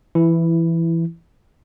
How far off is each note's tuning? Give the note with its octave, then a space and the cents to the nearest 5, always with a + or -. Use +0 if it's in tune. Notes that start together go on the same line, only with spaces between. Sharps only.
E3 +15 E4 +0